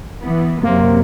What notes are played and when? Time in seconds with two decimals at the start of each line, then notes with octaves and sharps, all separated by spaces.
0.21 E3 B3
0.63 F#2 C3 A#3